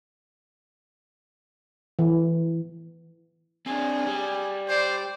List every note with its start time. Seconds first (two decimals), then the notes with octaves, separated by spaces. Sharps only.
1.99 E3
3.66 C4 D4 G#4
4.07 G3
4.69 C5 D5